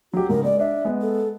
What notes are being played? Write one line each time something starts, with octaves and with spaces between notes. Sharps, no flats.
F#3 F#4 G4
G#2 C#3 A#4
G#3 D5
D4 E5
G#3 B3
A4